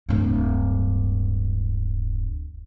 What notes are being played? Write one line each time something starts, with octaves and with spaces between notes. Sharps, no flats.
D1 G2